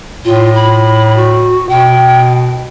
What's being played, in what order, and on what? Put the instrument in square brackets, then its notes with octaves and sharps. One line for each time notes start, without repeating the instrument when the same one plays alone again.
[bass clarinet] A2 [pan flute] F4
[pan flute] B5
F#4
[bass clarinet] B2 [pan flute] G5